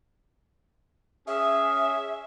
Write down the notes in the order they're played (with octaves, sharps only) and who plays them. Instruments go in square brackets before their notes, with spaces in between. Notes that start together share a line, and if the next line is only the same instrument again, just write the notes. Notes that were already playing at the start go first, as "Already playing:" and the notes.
[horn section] C#4 G#4 [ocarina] E5